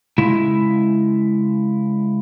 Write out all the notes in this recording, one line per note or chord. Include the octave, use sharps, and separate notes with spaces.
C#3 G#3 E4